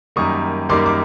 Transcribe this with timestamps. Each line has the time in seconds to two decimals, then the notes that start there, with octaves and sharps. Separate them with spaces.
0.16 F#2 D#3 G3 A#3 C#6 D#6
0.69 F#2 D#3 G3 A#3 C6 D6
0.86 D6